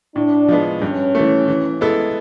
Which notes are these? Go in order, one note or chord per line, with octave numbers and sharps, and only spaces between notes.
A2 D4
F3 G#3 B3
G2 C#4
E3 A3
E3
G#3 B3 E4 A4